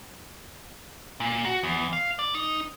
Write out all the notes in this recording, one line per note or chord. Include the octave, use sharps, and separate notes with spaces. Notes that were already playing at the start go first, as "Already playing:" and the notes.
A#2
F#4
E2
F5
D5
D#4